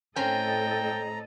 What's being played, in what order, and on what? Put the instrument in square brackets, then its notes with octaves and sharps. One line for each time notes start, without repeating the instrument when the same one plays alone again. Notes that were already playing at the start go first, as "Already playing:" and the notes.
[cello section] A2 A4 D#5 [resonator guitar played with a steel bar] C4 C#4 [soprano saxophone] G5 [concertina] A#5